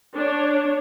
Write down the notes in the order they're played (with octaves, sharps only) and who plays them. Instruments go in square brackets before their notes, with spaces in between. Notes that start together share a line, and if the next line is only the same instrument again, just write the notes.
[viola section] D4 C#5